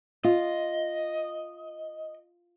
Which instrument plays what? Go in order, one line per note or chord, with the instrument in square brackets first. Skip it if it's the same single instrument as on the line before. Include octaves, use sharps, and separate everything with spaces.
[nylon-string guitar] F4 [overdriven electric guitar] D#5